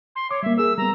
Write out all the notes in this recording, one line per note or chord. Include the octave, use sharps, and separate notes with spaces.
C6
C#5 D6
G3 A#3 E5
G#4 A#4 E6
G3 B3 A#5